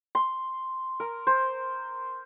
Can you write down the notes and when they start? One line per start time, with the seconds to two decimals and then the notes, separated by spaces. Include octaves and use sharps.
0.15 C6
1.00 A#4
1.27 C5